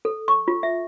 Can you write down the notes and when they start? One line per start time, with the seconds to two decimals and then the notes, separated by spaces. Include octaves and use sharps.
0.05 A4
0.28 C#6
0.48 F4
0.63 E5